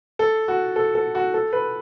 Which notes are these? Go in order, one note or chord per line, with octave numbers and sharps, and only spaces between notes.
A4
F#4
A4
A4
F#4
A4
B4